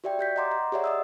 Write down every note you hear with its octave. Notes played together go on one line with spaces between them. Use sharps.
F#4 G4 D5 E5 G5
G4 G6 B6
D#5 F#5 A#5 C6 D6
A#5
G4 G#4 C#5 D5 E5 F#5
D#5 D#6 E6